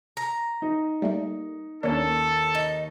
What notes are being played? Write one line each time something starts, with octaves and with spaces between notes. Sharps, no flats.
A#5
D#4
G3 A3 A#3
D#2 A#3 C#4 D4 A4 A#4
D#4